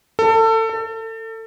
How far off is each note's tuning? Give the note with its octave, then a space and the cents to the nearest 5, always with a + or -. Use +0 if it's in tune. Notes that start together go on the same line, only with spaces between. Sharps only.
A4 +25
A4 +30